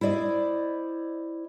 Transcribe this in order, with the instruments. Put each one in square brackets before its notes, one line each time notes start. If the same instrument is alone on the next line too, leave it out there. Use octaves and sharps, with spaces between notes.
[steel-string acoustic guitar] E4 C5 D5 D#5